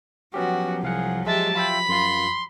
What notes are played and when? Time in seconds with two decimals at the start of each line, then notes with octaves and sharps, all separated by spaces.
0.34 F3 F#3 B3 C#4 F#4 G4
0.83 C2 G#4 F5 F#5
1.26 G#3 G4 E5 A5
1.55 F4 E5 G5 B5
1.89 F#2 F4 C6